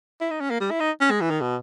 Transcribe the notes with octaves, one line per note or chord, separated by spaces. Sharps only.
E4
D#4
C#4
A#3
G3
E4
D#4
C#4
G#3
E3
D#3
B2